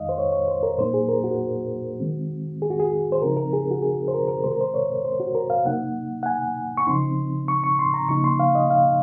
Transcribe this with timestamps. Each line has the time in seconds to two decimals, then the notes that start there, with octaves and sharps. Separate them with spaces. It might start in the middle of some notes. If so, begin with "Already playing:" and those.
Already playing: F2 D#3 G#3 D#4 D#5 F5
0.09 C5
0.18 C#5
0.33 C#5
0.48 C5
0.63 A#4
0.78 A#2 F#3 A#3 D#4 C5
0.94 G#4
1.09 A#4
1.24 F#4
2.00 D#3 G#3 C4
2.62 G#4
2.70 F#4
2.79 G#4
3.12 C5
3.22 C#3 F3 C4 D#4 A#4
3.37 A#4
3.53 G#4
3.71 F#4
3.82 G#4
4.08 C5
4.14 A#4
4.28 A#4
4.44 C3 D#3 G#3 C4 C5
4.52 A#4
4.61 C5
4.74 C#5
5.05 C5
5.20 F#4
5.35 A#4
5.50 F5
5.65 C3 F#3 A#3 D#4 F#5
6.23 F#5
6.26 G#5
6.77 C#6
6.87 C#3 F3 C4 D#4 C6
7.48 C#6
7.64 C#6
7.79 C6
7.94 A#5
8.08 C#3 F3 A#3 D#4 C#6
8.24 C6
8.40 F5
8.55 D#5
8.70 F5